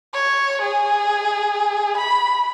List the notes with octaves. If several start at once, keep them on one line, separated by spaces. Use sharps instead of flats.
C#5
G#4
B5